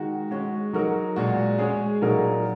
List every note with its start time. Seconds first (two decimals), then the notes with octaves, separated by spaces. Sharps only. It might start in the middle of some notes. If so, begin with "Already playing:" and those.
Already playing: D#3 G#3 F#4
0.31 G#3 C#4 F#4
0.73 F#3 D#4 F#4 A#4
1.16 A#2 G#3 F#4
1.59 G#3 C#4 G#4
2.02 A#2 F#3 D#4 F#4 A#4